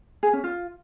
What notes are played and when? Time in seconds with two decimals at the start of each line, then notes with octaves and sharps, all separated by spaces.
0.23 G#4
0.33 C#4
0.44 F4